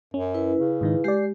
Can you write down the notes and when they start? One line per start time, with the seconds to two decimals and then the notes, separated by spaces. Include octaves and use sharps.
0.14 F#2 C#4
0.34 E4 B4
0.60 C#3
0.81 G#2 D#3 D#4
1.04 G#3 G4 D5 C7